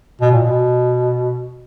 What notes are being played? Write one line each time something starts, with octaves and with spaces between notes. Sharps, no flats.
B2
A#2
B2